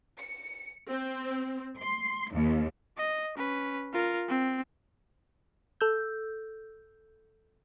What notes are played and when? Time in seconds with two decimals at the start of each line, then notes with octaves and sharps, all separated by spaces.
0.18 C#7
0.89 C4
1.79 C6
2.34 D#2
2.97 D#5
3.37 C#4 B4
3.93 F4 A#4
4.28 C4
5.81 A4 E6 G6